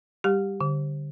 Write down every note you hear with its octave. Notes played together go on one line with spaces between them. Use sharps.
G3 G4
D3